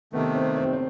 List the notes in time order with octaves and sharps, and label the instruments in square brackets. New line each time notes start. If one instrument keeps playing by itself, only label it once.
[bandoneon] C3 D#3 A3 [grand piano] B3
[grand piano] C4
C4
C4